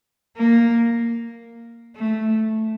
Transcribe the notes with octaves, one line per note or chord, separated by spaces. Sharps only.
A#3
A3